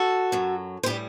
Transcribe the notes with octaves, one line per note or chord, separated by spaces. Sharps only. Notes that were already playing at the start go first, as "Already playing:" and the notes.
Already playing: F#4 A4
F#2 F#3
C5
A2 E3 G3 G4 B4